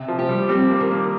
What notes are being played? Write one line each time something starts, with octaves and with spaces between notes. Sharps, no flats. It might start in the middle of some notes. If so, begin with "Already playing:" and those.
Already playing: C3
F3
G4
G3
G3 C4
A#3
D#3
A#3